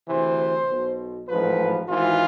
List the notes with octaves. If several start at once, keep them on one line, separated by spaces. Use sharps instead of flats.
D2 C3 E3 C5
B1 B2
A1 G#2 F3 B4
G#1 G#2 E3 F4